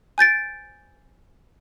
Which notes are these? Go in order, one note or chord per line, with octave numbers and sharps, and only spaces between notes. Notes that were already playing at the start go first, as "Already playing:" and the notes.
G#5 G6 A6 D7